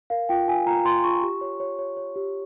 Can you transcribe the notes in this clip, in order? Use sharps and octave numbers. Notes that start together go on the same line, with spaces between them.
A#4 F5
F4 G5
F4 G#5
F4 A#5
F4 C6
F4 C#6
G4
C#5
C#5
C#5
C#5
G4